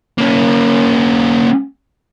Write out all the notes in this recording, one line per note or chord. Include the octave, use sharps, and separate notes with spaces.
A#3 C#4